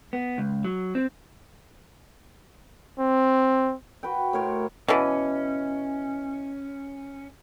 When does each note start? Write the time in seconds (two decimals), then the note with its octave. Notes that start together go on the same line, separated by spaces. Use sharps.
0.13 B3
0.38 C#2
0.65 F#3
0.95 C4
2.99 C4
4.03 F#4 B4 G5
4.33 A2 A#4 C#5 C6
4.88 B2 E3 C#4